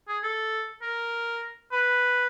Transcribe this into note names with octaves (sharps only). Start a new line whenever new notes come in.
G#4
A4
A#4
B4